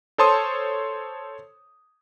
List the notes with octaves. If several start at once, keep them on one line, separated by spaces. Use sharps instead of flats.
A4 C5 C#5 A5 C6 D#6